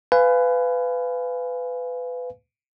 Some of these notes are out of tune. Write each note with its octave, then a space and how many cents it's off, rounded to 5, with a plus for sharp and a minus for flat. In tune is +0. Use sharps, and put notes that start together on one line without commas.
B4 +20 F5 -10 G#5 +0